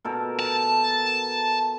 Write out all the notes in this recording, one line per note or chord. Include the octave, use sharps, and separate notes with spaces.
B2 A4 A#4
A5